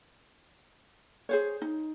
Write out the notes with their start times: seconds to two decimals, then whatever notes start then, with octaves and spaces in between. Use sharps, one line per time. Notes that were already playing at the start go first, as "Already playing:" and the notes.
1.29 G#4 C5 C#5
1.62 D#4